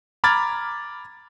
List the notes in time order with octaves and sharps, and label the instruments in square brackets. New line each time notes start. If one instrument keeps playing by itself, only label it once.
[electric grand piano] A#5 B5 D6 F6 G#6 A6